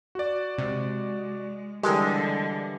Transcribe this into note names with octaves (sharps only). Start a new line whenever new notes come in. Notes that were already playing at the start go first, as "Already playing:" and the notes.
F#4 D5
C3 G#3
D3 E3 G3 G#3 G4 A4 A#4